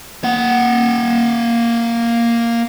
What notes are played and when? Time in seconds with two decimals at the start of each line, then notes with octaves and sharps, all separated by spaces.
0.24 A#3 F#5